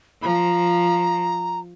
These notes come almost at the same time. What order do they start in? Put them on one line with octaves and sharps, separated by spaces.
F3 B5 A#5